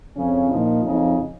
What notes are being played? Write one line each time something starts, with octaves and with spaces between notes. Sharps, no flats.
F2 C#3 F3 C#4
A#2 F3 D#4
F2 C#3 F3 D#4